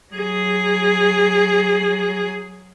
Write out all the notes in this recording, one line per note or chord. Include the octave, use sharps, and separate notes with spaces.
F#3 G#4